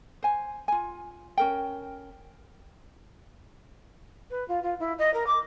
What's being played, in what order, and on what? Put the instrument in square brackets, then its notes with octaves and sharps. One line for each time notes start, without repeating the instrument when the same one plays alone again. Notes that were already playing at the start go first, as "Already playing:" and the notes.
[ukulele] C5 G#5
F4 G#5
C#4 A#4 G5
[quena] B4
F4
F4
E4
D#5
A#4
D6